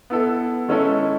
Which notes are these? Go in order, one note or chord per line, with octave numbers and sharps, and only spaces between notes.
B3 E4 A4
D#3 G#3 C#4 E4 A4